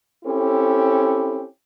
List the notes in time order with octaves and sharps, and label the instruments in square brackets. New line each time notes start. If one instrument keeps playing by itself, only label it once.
[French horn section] C4 C#4 E4 G4 A4